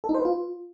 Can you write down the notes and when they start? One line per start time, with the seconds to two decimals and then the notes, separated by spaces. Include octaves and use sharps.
0.04 A4
0.09 D#4
0.14 C5
0.20 B4
0.25 F4